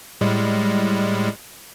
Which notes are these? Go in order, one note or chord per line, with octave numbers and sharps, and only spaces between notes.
A2 G3 G#3